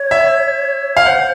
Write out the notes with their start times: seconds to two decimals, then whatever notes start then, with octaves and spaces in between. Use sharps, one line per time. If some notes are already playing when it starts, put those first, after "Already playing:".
Already playing: C#5
0.11 E5
0.97 F5
1.05 C5 F#5